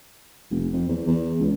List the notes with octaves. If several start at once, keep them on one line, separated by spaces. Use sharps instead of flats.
F1
F2
E2
E2
C#2